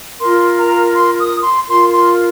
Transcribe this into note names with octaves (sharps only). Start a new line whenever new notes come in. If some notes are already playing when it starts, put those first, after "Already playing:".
F4 A#4 C6
A#5
C6
D#6
C6
F4 A#4 C6
C6